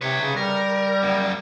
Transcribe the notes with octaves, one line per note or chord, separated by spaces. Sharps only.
C3 B4 C#5
C#3
G3 A#4
F#2 A#3